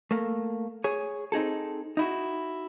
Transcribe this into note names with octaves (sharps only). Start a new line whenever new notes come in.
A3 A#3
G#4 C#5
C4 D#4 G#4 A4
D#4 E4 F#4